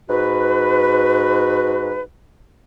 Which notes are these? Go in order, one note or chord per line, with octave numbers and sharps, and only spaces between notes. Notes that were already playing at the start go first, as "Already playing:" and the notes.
G#2 F#4 B4